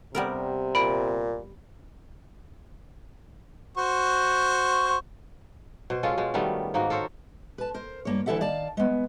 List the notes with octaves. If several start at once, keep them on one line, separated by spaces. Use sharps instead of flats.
C3 G3 B3 A#4
A#2 B5 D7
F#4 C5 C#6
B2 C5
G#3 C#4 F4 A4
B2 G#3
D#3 G3 A3 B3
G#2 A#3 D#4 F#4
A4 A#4 C5 C#5
B4 A5
A#4 C5
G2 A#3 C#5
D2 E3 E4 A4 E5 F#5
D#3 D5 F5 A5
G#3 B3